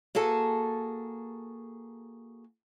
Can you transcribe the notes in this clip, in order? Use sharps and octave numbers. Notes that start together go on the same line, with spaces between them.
A#3 F#4 G#4 A4 A5